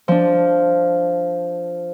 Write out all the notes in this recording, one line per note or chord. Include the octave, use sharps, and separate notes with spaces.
F3 D4